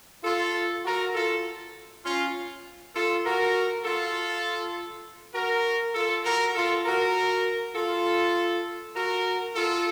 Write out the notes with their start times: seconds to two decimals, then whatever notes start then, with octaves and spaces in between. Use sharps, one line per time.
0.24 F4 A4
0.84 F#4 A#4
1.14 F4 A4
2.04 C#4 F4
2.94 F4 A4
3.24 F#4 A#4
3.85 F4 A4
5.35 F#4 A#4
5.95 F4 A4
6.25 F#4 A#4
6.55 F4 A4
6.85 F#4 A#4
7.75 F4 A4
8.95 F#4 A#4
9.55 F4 A4